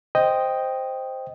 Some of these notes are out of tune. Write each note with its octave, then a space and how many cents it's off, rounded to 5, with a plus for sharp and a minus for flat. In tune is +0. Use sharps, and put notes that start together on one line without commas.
C5 +0 D#5 +0 G5 +0